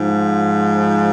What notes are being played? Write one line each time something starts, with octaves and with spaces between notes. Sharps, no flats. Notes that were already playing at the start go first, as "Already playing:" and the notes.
Already playing: G#2 F3